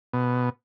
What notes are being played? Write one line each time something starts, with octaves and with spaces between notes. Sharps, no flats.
B2